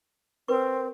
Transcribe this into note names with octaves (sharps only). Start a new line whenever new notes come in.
C4 A#4 B4 C#6